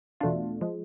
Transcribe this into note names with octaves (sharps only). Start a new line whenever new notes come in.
E2 B2 A3 D4 F4
F3 G#3